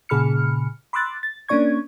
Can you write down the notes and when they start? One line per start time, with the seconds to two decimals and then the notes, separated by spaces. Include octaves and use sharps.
0.09 A#2 C#3 G#4 B5 F6 C#7
0.93 B5 C6 D6 E6 F#6 A6
1.23 A6
1.48 A#3 C#4 D4 D5 C#6 G#6